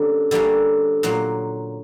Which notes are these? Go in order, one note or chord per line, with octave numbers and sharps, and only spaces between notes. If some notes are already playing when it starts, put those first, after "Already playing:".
Already playing: D3 G3 A#3 C#4 A4
D3 G3 A#3 C#4
A#2 F#3 A#3